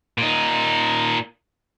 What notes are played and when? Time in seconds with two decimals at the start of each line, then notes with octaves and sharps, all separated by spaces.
0.18 A#2 D#4